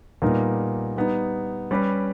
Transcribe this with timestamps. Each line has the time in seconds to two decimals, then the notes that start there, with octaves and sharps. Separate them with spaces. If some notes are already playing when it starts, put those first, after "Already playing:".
0.22 A#2 G3 B3 D#4 A#4
0.97 G3 B3 D#4
1.71 G3 C#4 G4 B4